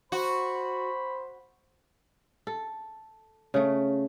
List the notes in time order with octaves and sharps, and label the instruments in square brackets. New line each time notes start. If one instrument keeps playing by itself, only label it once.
[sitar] F#4 [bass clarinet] C5 [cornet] B5
[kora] A4
C#3 A3